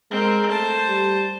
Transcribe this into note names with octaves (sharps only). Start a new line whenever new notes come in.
G#3 C4 A#4
A3 C5 A5
G3